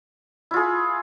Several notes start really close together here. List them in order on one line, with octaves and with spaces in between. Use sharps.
E4 F4 G#4